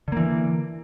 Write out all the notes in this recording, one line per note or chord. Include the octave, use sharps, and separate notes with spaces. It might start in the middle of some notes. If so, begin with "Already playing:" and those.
D3 E3 A#3